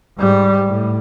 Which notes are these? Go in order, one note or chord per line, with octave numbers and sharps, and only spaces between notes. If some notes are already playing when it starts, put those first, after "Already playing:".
G#2 G3
A2